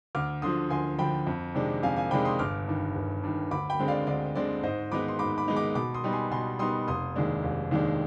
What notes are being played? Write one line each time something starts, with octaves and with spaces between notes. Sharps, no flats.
D2 D6 F6
D3 F3 C6 D#6
D2 G#5 C6
D3 F3 G5 B5
F2
C3 D#3 G#3 D4
F2 F5 G#5
F5 G#5
C3 D#3 G#3 D4 G5 B5
C6 D#6
G1 D6 F6
G2 D#3
G1
G2 D#3
D2 B5 D6
G5 B5
D3 G#3 C4
D5 F5
D2 D5
D3 G#3 C4 D5
G#2 C5 D#5
D#3 G#3 B3 D#4 B5 D6
C6
G#2 B5 D6
B5 D6
D#3 G#3 B3 D#4
B5 D6
B2 B5 D6
C6 D#6
G3 B3 D#4
G#5 C6
B2 G#5 C6
G3 B3 D#4 C6 D#6
F1 C6 D#6
D#2 D#3 G#3 D4
F1
D#2 D#3 G#3 D4